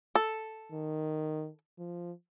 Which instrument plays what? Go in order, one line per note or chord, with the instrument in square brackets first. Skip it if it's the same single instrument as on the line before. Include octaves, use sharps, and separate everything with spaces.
[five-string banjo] A4
[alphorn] D#3
F3